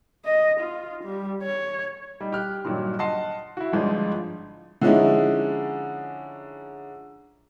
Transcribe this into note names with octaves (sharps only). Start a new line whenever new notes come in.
D#5
F4
G3
C#5
G3 D#4
G4 F6 F#6
G2 A#2 D#3 F#3
D#5 F#5 A5 C6 C7
E4 F#4
G1 G#2 F3 D4 D#4
D3 F3 G#3 C#4 D#4 E4